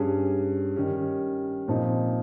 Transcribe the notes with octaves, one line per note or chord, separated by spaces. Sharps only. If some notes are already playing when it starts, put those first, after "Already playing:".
Already playing: G2 G3 C#4 G#4
D#3 G3 C#4
A#2 F3 C4 D#4